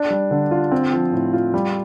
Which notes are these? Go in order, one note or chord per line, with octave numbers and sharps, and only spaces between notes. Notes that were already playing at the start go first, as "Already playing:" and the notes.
Already playing: D4
G3
D3
F4
C4
F3
A2
F4
G3